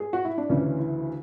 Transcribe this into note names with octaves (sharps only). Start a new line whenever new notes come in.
G#4
F#4
E4
D4
D2 C#3 E3 C#4
E4